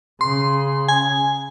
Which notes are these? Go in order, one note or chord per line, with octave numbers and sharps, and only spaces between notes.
C#3 C6
G#5